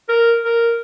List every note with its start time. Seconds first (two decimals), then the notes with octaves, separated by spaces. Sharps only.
0.09 A#4
0.45 A#4